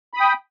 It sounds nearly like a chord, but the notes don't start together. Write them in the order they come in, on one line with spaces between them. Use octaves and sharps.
B5 D#6 G5